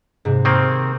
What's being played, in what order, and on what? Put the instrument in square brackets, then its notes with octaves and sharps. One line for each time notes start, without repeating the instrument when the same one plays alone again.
[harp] G#2 C3
[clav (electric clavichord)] D#3 A#3 C4 [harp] C5 G5